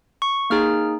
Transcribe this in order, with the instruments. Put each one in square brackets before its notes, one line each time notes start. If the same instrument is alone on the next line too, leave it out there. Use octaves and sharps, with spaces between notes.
[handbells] C#6
A#3 D#4 G#4 F6